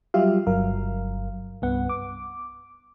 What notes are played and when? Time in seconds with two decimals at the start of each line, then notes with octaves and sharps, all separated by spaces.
0.14 F#3 G3 F4 G4 E5 F5
0.47 G1 G2 F#3 A#4 F5
1.62 C2 G2 B3 F#5
1.89 D6